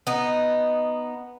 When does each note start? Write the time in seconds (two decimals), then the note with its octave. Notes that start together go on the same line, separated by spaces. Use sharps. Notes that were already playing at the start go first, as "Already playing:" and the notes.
0.07 B3 D#4